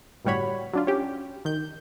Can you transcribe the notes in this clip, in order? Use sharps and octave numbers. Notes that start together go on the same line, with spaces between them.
G1 A2 G3 F#4 C#5 B5
F#3 D4 F4
C#4 G4
D#3 G6